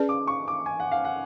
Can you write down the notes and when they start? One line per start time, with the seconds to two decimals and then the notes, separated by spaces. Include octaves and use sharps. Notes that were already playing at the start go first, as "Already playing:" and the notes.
Already playing: C#4 G#4 B4 D5
0.09 D6
0.27 C#6
0.48 D6
0.66 G#5
0.80 F#5
0.92 F5
1.05 F#5